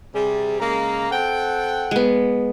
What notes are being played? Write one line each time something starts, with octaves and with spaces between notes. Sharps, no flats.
C3 G3 G#4
C#3 G#3 A#3 A#5
C4 A4 F#5 G5
G#3 B3